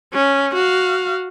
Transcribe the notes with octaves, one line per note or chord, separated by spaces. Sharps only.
C#4
F#4 F5